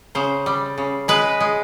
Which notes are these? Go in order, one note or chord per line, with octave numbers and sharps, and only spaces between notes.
C#3 C5
G3
C#3
G#3 B4
G#3